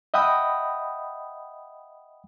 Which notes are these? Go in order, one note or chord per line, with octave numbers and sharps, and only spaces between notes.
D#5 E5 F#5 G5 B5 D#6